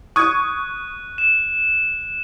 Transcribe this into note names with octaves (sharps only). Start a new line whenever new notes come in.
C#6 D#6 F#6 G#6 D#7
E7